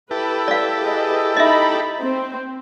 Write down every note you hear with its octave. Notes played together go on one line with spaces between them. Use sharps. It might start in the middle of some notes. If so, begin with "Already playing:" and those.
E4 G4 A4 B4
D5 F5
G#4 B4 D#5
D#4 D#5 E5 B5
C4 C5